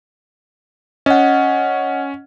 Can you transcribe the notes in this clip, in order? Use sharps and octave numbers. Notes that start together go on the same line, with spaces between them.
C#4 D#5 F#5